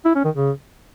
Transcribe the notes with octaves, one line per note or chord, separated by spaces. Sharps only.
E4
C#4
D#3
C#3